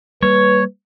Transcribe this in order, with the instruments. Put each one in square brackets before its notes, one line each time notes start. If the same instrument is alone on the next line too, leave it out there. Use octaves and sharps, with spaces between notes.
[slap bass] G3 A#3 [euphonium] B4 [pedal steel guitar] C#5